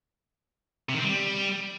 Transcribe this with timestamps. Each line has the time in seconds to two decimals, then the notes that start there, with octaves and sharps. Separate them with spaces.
0.89 C3
0.94 D#3
0.99 C4
1.04 G3